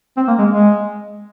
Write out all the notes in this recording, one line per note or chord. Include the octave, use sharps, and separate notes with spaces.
C4
A#3
G#3
G#3